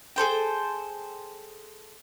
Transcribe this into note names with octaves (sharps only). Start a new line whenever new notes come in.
G#4 A4 C5 G5